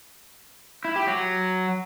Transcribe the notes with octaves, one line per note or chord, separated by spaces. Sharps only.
E4
G4
F#3